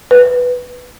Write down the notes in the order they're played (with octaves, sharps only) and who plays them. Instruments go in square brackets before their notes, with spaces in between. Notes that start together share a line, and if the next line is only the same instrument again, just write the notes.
[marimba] B4